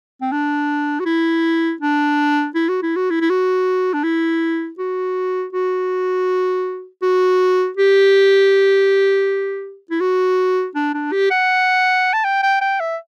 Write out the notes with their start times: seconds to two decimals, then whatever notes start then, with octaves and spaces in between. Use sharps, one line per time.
0.22 C4
0.32 D4
1.00 F#4
1.06 E4
1.81 D4
2.55 E4
2.69 F#4
2.83 E4
2.96 F#4
3.10 E4
3.21 E4
3.30 F#4
3.94 D4
4.04 E4
4.79 F#4
5.53 F#4
7.02 F#4
7.77 G4
9.91 E4
10.00 F#4
10.75 D4
10.94 D4
11.12 G4
11.31 F#5
12.13 A5
12.24 G5
12.43 G5
12.61 G5
12.80 E5